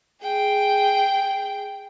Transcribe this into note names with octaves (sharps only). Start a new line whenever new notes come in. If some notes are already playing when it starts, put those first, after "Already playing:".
G#4 G5